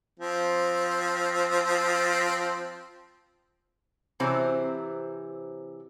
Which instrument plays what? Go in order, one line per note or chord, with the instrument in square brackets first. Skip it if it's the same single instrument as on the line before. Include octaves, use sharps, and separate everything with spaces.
[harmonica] F3 C4
[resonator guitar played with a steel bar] C3 E3 F#3 C4